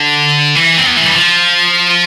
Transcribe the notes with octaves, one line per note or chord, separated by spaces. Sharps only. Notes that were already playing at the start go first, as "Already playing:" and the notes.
Already playing: D3
E3
C4
B3
A3
G3
F3